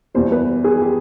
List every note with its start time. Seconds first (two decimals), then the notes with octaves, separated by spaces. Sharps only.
0.14 E2 B2 G3 C5
0.32 B4
0.64 G#4
0.82 G4